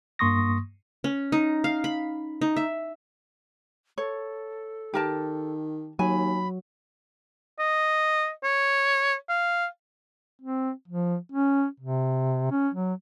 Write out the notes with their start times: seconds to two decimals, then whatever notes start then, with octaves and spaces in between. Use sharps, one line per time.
0.19 G2 A#3 C6 C#6 D#6 A#6
1.04 C#4
1.32 D#4
1.64 F5
1.84 B5
2.41 D#4
2.56 E5
3.98 A4 C#5
4.94 D#3 G4 A#4 A5
5.99 D#2 F#3 G#5 B5
7.59 D#5
8.44 C#5
9.29 F5
10.42 C4
10.88 F3
11.32 C#4
11.80 C3
12.51 C#4
12.75 F#3